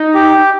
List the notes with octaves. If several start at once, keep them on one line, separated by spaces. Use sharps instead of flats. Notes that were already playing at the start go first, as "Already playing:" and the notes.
Already playing: D#4
G4